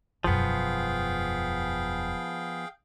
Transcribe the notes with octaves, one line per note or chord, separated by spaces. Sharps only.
E1 F#2 F3 B3 G#4 F5 G5